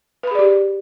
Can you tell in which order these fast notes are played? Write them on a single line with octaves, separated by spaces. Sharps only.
B4 B5 G#4 D5 G4